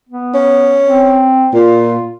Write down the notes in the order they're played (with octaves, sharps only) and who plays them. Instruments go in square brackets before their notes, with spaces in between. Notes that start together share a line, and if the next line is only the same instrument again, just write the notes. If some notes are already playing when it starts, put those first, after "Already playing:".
[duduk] B3
[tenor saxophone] C#4
[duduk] C4
[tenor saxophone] A#2 [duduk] F4